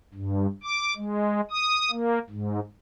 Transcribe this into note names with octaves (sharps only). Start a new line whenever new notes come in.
G2
D6
G#3
D#6
A#3
G#2